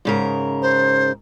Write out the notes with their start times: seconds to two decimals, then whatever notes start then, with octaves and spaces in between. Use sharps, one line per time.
0.05 G#2 C#3 A#4
0.62 C5